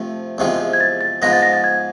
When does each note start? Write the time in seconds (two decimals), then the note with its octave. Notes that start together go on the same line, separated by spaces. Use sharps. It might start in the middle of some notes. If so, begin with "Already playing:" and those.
Already playing: C3 F3 A3
0.38 E2 C3 F3 G#3
0.73 G#6
0.80 A6
1.01 A6
1.22 G#2 F3 G#3 B3 A#6
1.33 A6
1.42 A#6
1.53 A6
1.64 G#6